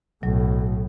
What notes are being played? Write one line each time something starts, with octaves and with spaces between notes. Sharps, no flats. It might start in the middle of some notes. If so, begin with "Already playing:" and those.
B1 A2 F#3